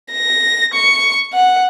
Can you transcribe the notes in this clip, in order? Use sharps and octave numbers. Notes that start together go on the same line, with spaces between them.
A#6
C#6
F#5